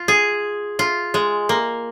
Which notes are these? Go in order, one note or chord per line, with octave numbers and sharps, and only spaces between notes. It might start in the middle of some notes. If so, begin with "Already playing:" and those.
Already playing: F4
G#4
F4
G#3
A#3